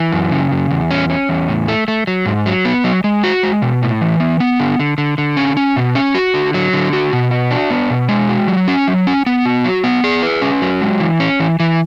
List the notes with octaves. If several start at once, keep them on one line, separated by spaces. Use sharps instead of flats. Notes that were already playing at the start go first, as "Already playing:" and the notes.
Already playing: E3
F#2
C#3
F#2
E2
C#4
C#4
E2
A2
A3
A3
F#3
G#2
F#3
B3
F#3
G#3
F#4
G#3
B2
A2
E3
B3
B3
D3
D3
D3
D3
C#4
C#4
B2
C#4
F#4
D3
F#3
D3
F#4
B2
F#4
D4
B3
B2
G#3
F#4
F#3
C#4
F#3
C#4
B3
F#4
F#3
B3
G#4
B4
C#4
F#3
G#3
E3
C#4
E3
E3